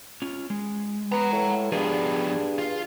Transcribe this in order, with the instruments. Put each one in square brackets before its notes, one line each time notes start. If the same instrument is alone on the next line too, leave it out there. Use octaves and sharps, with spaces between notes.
[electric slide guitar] C#4 F4
G#3
[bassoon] B3 [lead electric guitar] F#5 A#5
[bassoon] A2
[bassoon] G2 [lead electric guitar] F3 B3 [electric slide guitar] D4 G#4
[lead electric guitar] F4